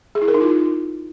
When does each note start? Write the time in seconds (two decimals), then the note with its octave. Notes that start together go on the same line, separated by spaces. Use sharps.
0.15 G#4
0.22 E4
0.28 A#4
0.34 D#4
0.41 F4